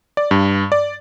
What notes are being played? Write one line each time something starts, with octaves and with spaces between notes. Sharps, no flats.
D5
G2
D5